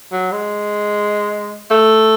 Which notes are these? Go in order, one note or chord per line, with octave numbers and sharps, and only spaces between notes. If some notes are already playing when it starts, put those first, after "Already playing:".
F#3
G#3
A3